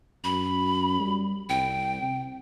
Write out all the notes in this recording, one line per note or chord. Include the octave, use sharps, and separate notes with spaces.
F#2 B5
G3
C2 G5
C3